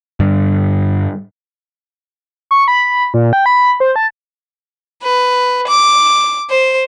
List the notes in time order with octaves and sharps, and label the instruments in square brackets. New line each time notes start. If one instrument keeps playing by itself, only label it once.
[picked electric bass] G2 D3
[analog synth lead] C#6
B5
A#2
G5
B5
C5
A5
[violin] B4
D6
C5